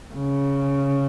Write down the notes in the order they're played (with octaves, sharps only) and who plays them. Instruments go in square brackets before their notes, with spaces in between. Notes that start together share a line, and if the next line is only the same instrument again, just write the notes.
[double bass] C#3